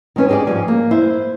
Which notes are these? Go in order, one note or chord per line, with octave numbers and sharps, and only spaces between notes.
D#3 G#3 C#4 B4
D#4 G4 G#4 C5 D5
G#2 F3 G3 C#4 G#5
A#3
E4 C5